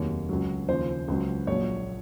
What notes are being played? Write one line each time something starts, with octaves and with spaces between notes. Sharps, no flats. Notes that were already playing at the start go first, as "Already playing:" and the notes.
Already playing: F1 D#2 D#3 F#3 C#5
C#2 C#3 F#3
D#2 C#3 F3 C5
C#2 C#3 F#3
A#1 A#2 F#3 C#5